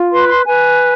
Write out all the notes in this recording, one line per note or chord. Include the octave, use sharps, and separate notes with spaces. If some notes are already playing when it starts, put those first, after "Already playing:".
Already playing: F4
B4 C6
C6
B4 G#5